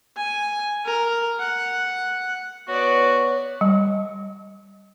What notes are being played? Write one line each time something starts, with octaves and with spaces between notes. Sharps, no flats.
G#5
A#4
F#5
B3 F#4 C#5 D5
G3